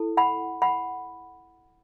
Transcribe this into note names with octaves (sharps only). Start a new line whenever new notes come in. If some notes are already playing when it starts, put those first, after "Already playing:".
Already playing: E4 A4
F#5 B5
F#5 B5